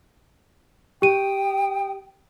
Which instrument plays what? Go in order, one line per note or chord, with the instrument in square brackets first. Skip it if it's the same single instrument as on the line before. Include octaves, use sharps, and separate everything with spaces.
[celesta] G4 D#7 [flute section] G5 D#6